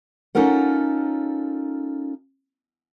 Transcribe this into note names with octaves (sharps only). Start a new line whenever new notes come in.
C#4 D#4 F4 A4 A#4 F#5